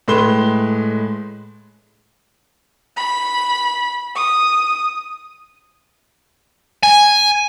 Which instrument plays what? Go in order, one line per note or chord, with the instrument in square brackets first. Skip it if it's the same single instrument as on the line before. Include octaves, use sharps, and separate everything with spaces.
[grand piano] A2 G#3 B4 C6 E7 G7
[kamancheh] B5
D#6
[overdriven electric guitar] G#5